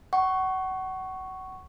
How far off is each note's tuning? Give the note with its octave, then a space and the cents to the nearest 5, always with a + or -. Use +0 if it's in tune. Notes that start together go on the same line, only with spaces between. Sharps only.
F#5 +30 C#6 +0